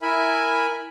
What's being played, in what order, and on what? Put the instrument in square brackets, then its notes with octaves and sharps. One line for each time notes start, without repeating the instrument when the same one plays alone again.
[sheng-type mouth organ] E4 A#4 E5 G#5 B5